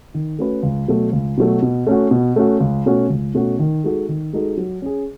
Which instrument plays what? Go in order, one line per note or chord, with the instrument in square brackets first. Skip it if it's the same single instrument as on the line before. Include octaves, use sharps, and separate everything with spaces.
[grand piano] D#3
A3 C#4 F#4 B4
C#2
B2 F#3 A3
C#2
B2 F#3 A3
B2
A3 C#4 F#4
B2
A3 C#4 F#4
C#2
B2 A3 C#4 F#4
C#2
B2 A3 C#4 F#4
D#3
G#3 D#4 F#4 A4
D#3
G#3 D#4 F#4 A4
F#3
C#4 G#4